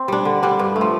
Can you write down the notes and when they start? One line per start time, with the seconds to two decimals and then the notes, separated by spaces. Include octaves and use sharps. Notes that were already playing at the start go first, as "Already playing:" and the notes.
Already playing: C4
0.08 G3 D4
0.25 D3
0.43 G3 D4
0.59 G2
0.76 A3
0.81 F3